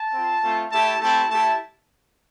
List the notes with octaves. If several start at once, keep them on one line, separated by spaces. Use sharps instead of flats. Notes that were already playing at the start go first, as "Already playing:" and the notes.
Already playing: A5
C4 F4
A3 C4 F4
A3 E4 G4 A5
A3 C4 E4 G4 A5
A3 E4 G4 A5